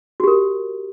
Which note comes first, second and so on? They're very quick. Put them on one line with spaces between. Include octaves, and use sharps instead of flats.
F#4 G4 A#4